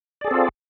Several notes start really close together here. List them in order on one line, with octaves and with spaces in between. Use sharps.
D5 G#4 A4 C4 F4